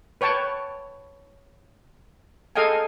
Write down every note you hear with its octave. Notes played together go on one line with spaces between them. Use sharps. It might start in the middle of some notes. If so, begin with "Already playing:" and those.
B4 C#5 G5 A5
G#4 A4 D#5 F5 G5 G#5